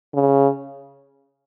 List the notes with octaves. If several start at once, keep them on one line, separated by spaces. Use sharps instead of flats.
C#3